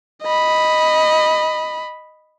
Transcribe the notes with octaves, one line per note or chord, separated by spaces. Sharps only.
D#5 B5